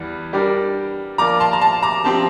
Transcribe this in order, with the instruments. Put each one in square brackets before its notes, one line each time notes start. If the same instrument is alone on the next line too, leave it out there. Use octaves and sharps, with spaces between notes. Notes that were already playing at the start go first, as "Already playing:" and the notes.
Already playing: [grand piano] E2 E3 G3
G3 D4 G4 A#4 D5
[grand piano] F3 A#3 F4 A#4 D5 [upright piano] A#5 D6
[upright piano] A5 C6
A#5
A5 C6
A#5 D6
[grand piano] F3 C4 G4 [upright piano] A5 C6